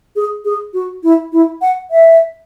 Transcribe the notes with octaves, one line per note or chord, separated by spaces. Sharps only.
G#4
G#4
F#4
E4
E4
F#5
E5